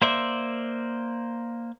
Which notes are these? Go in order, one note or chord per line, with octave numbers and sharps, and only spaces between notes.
A#3 C5 D5 E5